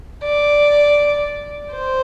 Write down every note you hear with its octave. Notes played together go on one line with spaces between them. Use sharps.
D5
C5